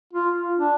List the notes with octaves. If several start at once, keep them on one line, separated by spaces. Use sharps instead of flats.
F4
D4